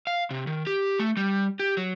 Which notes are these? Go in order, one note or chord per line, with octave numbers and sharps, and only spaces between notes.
F5
C3
D#3
G4
A3
G3
G4
F#3